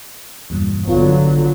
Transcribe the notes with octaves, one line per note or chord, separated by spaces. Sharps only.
E2 G2 A#2
A1 D3 F#3 B3 F4